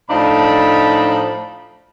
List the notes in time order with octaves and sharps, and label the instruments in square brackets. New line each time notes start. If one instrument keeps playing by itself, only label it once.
[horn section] A2 F3 D4 D#4 A5 B5